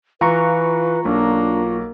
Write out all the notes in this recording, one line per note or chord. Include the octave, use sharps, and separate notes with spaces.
E3 F4 B4 A#5 C#6
B1 A#3 D4